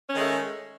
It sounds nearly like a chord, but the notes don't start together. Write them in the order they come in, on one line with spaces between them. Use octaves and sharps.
C#4 D#3 G#3 A3